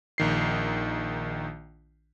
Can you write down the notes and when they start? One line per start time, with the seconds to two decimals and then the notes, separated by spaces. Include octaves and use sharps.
0.18 A#1 D#3 C7